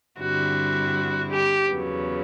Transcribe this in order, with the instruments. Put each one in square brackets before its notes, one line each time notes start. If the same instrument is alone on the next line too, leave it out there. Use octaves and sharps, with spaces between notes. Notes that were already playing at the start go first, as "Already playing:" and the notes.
[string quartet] G2 D3 G3 C4 E4 [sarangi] F#4
[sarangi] G4
[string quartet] E2 C#3 F#3 B3